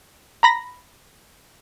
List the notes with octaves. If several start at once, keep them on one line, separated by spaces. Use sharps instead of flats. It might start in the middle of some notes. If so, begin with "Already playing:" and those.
A#5 B5 A#6